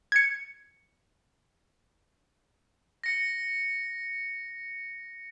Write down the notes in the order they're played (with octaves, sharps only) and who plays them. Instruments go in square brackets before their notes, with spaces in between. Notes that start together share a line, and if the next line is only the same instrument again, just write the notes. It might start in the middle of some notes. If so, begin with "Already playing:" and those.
[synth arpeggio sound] G#6 C#7
[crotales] A#6 C#7